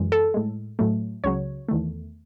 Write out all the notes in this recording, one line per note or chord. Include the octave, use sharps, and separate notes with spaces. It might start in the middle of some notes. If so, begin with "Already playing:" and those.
Already playing: F#2 E3 G#3
A4
A2 G#3
A2 F#3 A3
C#2 C#3 F#3 C#5
E2 D#3 A3